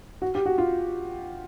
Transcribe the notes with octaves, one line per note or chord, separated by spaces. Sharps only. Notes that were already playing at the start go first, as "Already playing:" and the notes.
F#4
G4
F#4
F4